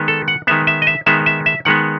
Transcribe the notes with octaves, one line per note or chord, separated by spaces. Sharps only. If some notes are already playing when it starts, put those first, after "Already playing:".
Already playing: D#3 G#3 B3
A4
F#5
D#3 G#3 B3 E5
E5
D#5
E5
D#3 G#3 B3 E5
E5
E5
D#3 G#3 B3 F#5